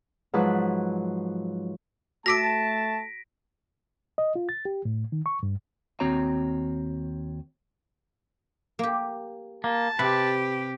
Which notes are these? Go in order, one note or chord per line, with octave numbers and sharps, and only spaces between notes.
G#2 F3 F#3 B4 A5 F#6
A3 F#4 A5 D6 E6 A#6 B6 D7
D#5
F4
A6
G4
A2
D#3
C#6
G2
D#2 C4 F#4 C#5 A#5
A#3 G4
A#3 A5
C3 G4 B4